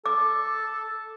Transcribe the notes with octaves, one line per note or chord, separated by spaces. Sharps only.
A4 D6